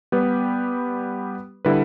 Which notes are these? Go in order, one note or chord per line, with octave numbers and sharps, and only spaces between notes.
G3 B3 G4 B4
D3 G3 E4 B4